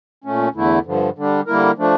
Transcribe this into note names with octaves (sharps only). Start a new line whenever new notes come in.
A#2 A3 C#4
E2 D3 A3 E4
G2 D3 F3
D3 G3 D4
D3 G3 A#3 E4 A#4
F3 A3 D4